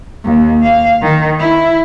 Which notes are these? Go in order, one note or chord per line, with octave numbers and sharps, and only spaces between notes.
D#2
F5
D#3
E4